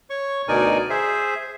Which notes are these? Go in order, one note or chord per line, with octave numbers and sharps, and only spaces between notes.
C#5 C#6
D2 B2 D#4 A#4 D5 G#5
G#4 C5 E5